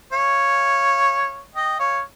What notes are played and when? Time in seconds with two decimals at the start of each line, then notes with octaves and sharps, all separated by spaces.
0.12 C#5 F5
1.55 D#5 G5
1.79 C#5 F5